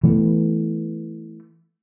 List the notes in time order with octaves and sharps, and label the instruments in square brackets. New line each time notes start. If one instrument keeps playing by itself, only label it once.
[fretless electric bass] E3 A3 B3